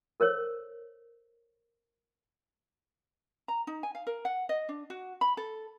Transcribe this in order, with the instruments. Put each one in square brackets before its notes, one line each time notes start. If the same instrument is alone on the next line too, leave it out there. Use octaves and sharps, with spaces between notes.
[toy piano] A4 A#4 C5 C#5
[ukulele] A#5
D#4
G#5
F5
A#4
F#5
D#5
D4
F#4
B5
A4